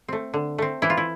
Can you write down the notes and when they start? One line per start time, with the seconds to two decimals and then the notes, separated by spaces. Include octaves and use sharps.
0.08 A3 C4
0.34 D3
0.58 A3 C4
0.82 E3 E4
0.90 F4
0.97 E4